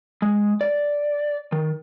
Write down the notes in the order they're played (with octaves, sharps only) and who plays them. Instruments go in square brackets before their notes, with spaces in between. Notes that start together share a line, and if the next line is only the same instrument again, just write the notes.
[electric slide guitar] G#3
D5
D#3